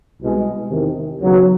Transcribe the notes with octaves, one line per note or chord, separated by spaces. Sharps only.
C2 B2 G#3
E2 C3 D#3
D#2 C#3 F#3 B3